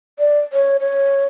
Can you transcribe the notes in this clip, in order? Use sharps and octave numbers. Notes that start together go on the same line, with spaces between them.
D5
C#5
C#5